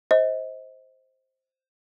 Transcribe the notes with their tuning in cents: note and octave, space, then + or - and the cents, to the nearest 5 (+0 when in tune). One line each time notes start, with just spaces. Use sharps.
C5 +0 D#5 +35